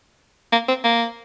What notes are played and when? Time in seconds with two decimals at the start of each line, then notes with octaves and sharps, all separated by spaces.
0.52 A#3
0.68 C4
0.84 A#3